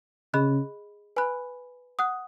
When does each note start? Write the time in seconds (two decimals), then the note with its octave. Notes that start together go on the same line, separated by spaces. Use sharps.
0.34 C#3 G#4 D#5 B5 F#6
1.16 B4 G#5 B5 F#6
1.99 F#5 D#6 F#6